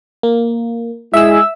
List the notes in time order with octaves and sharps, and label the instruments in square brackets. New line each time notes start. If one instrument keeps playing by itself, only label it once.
[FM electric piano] A#3
[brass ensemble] G#3 E4 G#4 [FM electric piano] E5 E6